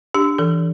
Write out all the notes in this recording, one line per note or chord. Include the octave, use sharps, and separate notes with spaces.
D4 G4
E3 A4